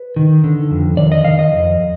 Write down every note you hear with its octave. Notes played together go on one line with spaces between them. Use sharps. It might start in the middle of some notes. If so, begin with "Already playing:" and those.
Already playing: B4
D#3
D3
F2
D#3 D5
D#5
D#3 F5
D#5
F2